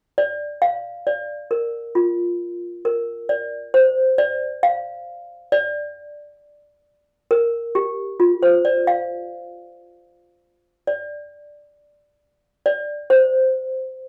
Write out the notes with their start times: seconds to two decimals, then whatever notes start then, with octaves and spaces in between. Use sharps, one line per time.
0.18 D5
0.62 F5
1.07 D5
1.51 A#4
1.95 F4
2.85 A#4
3.29 D5
3.74 C5
4.18 D5
4.63 F5
5.52 D5
7.31 A#4
7.75 G4
8.20 F4
8.43 C5
8.65 D5
8.87 F5
10.87 D5
12.66 D5
13.10 C5